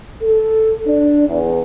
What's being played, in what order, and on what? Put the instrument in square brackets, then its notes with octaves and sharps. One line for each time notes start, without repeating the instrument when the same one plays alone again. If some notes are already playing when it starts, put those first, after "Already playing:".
[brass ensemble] A4
D4
E2